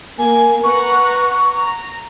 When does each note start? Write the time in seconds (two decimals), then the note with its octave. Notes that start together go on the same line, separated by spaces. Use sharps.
0.19 A#3 G#5
0.64 B4 F#5 A#5 C#6
1.52 A#5